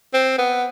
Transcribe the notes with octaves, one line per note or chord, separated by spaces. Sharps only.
C4
B3